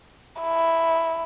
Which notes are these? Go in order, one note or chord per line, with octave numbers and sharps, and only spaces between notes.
E4